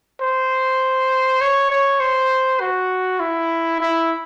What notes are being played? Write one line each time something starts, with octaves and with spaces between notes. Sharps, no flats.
C5
C#5
C#5
C5
F#4
E4
E4